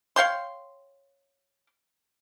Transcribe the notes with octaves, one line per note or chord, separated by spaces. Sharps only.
C#5 F5 G5 C6